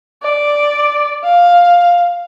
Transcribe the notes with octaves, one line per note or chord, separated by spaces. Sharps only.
D5
F5